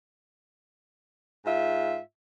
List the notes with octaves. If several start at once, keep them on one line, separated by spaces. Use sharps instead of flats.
G#2 F4 E5